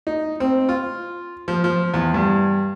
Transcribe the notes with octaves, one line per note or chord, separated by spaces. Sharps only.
D#4
C4
F4
F3
F3
E2
G2